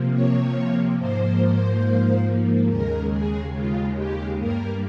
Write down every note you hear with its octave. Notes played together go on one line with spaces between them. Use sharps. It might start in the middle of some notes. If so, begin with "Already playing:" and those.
Already playing: C3 F3 A#3
C#5
G#2 F3 A#3 C5
D#2 C#3 G#3 A#4
G#4
F4
G4
G2 G3 A#3 A#4